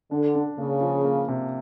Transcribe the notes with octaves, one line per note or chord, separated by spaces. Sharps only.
D3 D4
D4
C#3 A#3
F3
A#3
C3